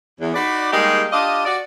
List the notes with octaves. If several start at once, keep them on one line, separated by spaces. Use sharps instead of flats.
E2
D#4 F#4 B4 D5
G3 G#3 A#3 D#4 G4 G#4
D4 F4 G4 D5 D#5
F#4 D5